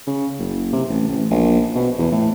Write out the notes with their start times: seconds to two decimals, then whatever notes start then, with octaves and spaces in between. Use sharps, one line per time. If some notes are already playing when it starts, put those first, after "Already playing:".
0.07 C#3
0.39 F#1
0.73 C3
0.90 A1
1.08 A1
1.30 A#1
1.75 B2
1.99 E2
2.12 A2